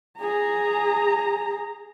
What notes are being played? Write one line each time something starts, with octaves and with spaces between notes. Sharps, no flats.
G#4 A#5